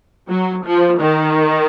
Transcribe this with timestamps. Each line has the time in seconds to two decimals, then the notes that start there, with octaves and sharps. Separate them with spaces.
0.29 F#3
0.65 F3
0.99 D#3